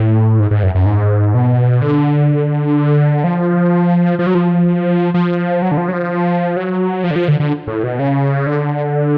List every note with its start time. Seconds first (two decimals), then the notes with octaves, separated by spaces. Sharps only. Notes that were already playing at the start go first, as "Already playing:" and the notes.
Already playing: A2
0.39 G#2
0.51 G#2
0.63 F#2
0.75 F#2
0.86 G#2
1.34 B2
1.81 D3
3.24 F3
4.19 F3
4.27 F#3
4.35 F3
5.14 F3
5.62 F#3
5.72 D3
5.77 F3
5.88 F#3
5.93 F3
6.56 F#3
7.04 F3
7.11 D3
7.16 F3
7.28 D3
7.40 D3
7.67 A2
7.84 B2
7.99 C#3
8.47 D3